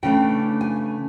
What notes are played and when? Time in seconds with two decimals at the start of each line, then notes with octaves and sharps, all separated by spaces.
0.03 C#3 E3 A3 D4 G5
0.61 G#5